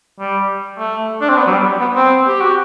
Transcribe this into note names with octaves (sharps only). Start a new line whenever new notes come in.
G3
A3
D4
C4
B3
F#3
G3
B3
C4
G4
F#4